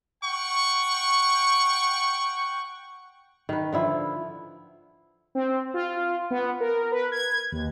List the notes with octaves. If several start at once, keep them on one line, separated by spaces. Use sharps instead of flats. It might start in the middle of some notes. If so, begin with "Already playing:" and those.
F#5 G5 C#6
D#3 B4
D3 F3 E4
C4
F4
B3
A#4
B4
G#6
D#2